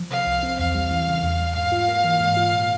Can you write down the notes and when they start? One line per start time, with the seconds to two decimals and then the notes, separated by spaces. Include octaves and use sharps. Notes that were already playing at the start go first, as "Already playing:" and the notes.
Already playing: F3
0.11 C3 F5
0.27 C2
0.43 C4
0.59 E2 F5
0.75 G3
0.91 E3
1.07 C#3
1.23 E2
1.39 G3
1.55 G#2 F5
1.72 F4
1.88 A#3
2.05 E3
2.20 G#2
2.37 F4
2.53 A#2